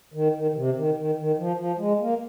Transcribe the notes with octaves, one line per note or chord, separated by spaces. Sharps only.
D#3
D#3
D#3
C3
D#3
D#3
D#3
F3
F3
G#3
A#3